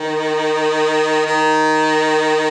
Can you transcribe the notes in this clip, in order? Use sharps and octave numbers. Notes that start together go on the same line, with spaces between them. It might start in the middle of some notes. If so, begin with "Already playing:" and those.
Already playing: D#3
D#3